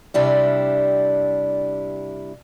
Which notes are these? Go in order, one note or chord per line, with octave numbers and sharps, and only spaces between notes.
C3 G3 D4 E4